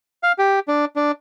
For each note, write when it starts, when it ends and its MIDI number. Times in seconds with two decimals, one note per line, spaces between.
0.23 0.32 77
0.38 0.60 67
0.68 0.85 62
0.96 1.12 62